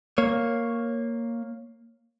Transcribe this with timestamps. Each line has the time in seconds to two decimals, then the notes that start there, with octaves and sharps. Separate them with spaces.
0.18 A#3 C#5